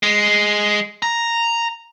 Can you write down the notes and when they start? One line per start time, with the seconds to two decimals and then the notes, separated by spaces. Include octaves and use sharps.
0.03 G#3
1.02 A#5